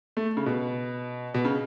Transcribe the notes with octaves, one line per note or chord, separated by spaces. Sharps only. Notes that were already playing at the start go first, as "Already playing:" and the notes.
A3
C#3
B2
B2
C#3